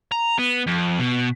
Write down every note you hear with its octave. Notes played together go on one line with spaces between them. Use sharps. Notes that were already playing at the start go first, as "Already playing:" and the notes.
A#5
B3
F2
B2